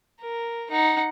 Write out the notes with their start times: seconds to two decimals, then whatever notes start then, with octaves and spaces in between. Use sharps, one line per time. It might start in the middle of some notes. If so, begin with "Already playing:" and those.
0.21 A#4
0.71 D#4 F#5